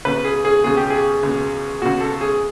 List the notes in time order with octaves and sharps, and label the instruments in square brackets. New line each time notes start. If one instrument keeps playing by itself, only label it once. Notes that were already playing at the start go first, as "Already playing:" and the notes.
[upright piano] C#2 B2 B4
G#4
G#4
C#2 B2 G#4
G4
G#4
C#2 B2
C#2 B2 F#4
A4
G#4